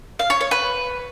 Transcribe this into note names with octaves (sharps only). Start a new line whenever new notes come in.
F5
C#5
C#5
B4